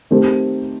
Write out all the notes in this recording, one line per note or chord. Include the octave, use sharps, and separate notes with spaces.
D#3 A3 C4 G4